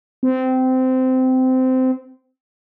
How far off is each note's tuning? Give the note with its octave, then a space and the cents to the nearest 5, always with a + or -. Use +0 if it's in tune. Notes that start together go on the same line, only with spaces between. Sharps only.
C4 -20